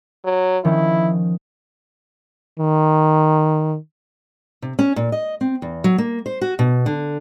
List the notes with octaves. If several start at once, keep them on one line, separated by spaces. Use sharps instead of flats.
F#3
D#3 F3 C#4 E4
D#3
C3
C#4
A#2
D#5
C4
E2
F#3
A#3
C5
F#4
B2
D3